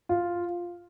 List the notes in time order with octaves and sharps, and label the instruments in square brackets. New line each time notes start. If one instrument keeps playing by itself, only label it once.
[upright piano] F4